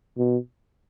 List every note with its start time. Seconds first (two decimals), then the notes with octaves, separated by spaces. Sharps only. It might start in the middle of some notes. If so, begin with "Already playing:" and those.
0.18 B2